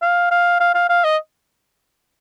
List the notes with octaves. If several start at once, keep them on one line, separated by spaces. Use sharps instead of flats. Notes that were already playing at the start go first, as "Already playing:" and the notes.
F5
F5
F5
F5
F5
D#5